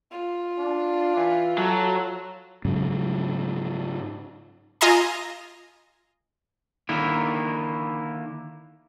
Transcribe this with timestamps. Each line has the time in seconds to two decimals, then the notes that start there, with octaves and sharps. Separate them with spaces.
0.12 F4
0.58 D4
1.17 E3
1.58 F#3 A4
2.65 G#2 C#3 F#3
4.81 F4 D#5 G#5 A#5 C6
6.89 D3 D#3 A#3 E4